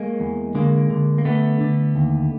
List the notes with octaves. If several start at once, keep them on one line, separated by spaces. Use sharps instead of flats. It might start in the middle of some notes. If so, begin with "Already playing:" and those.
Already playing: G#3 A#3
E2
D3 G#3 A#3
D3
A#3
D3 A3 B3
D3
D#2